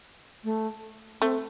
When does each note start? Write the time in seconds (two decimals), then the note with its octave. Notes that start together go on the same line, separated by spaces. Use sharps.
0.44 A3
1.21 A3 C4